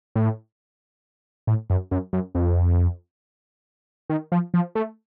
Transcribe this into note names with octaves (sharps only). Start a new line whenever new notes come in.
A2
A2
F#2
F#2
F#2
F2
D#3
F3
F3
A3